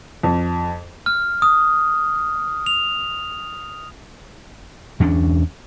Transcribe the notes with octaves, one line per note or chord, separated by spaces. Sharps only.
F2
F6
D#6
F7
E2 C#4 D4